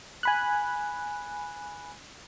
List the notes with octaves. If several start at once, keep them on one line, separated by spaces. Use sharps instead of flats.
G#5 B5 F#6